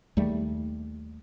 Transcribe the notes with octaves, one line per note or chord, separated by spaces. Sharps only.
D#2 G3 A3